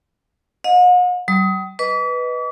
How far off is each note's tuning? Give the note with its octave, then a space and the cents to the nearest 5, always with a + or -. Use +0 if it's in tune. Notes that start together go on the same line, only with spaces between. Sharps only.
D#5 -5 F#5 -45
G3 -45 D#6 +25
B4 +0 D#5 +0 D6 -45